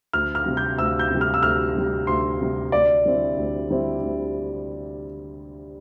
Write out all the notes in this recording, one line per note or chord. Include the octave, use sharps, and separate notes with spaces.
D2 F6
F6
C3 G3
G6
D2 E6
G6
C3 G3
F6
E6
D2 F6
C3 G3
D2 C6
C3 G3
D2 D5
D3 G3 C4 E4
D2
D3 G3 C4 E4
D2